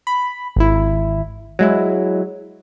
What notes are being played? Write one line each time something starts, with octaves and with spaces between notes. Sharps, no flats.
B5
G#1 E4
F#3 G#3 E4